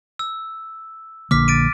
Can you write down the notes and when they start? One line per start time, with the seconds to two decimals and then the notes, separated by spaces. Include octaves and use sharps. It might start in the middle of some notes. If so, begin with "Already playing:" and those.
0.19 E6
1.31 A#1 D3 A#3 D6 F6 B6
1.48 A6 D7 D#7